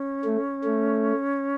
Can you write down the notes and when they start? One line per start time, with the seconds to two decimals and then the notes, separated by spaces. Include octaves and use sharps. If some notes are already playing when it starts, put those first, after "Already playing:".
Already playing: C#4
0.25 A3
0.65 A3